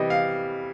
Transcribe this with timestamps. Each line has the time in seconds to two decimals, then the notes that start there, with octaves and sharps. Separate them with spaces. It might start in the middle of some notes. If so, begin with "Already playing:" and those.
Already playing: C3 E3 G3 D#5
0.10 F5